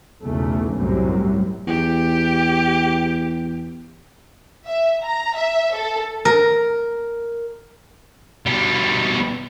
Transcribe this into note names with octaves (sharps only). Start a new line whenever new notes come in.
B1 E2 C#3 A3
C2 F#2 A2 C3 F#3 G3
E2 G4
E5
A#5
E5
A4
A#4
B2 G3